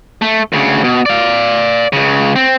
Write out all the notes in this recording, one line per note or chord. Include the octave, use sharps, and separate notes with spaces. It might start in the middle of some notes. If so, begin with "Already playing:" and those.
A3
D2 C#3
B2
D5 F5
C#2 C#3
C4